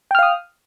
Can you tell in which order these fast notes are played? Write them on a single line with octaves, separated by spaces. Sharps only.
G5 F6 F5 D#6